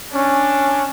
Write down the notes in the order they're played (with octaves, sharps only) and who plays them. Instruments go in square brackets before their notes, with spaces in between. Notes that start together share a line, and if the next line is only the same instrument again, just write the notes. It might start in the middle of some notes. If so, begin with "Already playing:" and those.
[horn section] C#4 D4